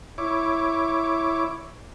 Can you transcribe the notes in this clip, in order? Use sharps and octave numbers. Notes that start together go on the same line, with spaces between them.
E4 C#5 D6